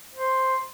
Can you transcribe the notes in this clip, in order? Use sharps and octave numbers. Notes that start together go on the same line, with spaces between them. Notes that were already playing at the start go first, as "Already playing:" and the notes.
C5